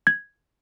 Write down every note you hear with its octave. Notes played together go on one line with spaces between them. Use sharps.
G#6